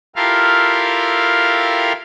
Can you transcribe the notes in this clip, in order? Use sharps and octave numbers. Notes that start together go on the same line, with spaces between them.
E4 F4 G4 A4 A#4 F5